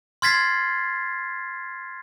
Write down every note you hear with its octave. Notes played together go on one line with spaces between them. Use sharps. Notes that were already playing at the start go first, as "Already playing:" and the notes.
C6 F6 G#6 A6 B6 C7